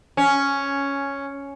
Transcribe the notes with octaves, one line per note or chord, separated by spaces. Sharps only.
C#4